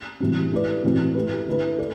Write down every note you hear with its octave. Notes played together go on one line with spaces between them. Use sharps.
A2 E3 G3 C4 F#4
A3 E4 G4 B4 D5
A2 E3 A3 C4 F#4
A3 E4 G4 B4
D3 A3 E4 B4
A4 D5